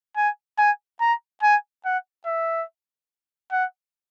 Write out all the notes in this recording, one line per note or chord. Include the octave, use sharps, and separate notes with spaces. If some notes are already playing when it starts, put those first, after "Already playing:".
G#5
G#5
A#5
G#5
F#5
E5
F#5